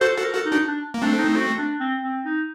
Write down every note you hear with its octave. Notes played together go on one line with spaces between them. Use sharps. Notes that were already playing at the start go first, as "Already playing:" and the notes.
F#4 A4 C5
F#4 A4
A#4
F#4 A4
D#4
D4 F#4
D4
A#3
A3 C4 D4
D#4
D#4
F#4
D4
C4
C4
D#4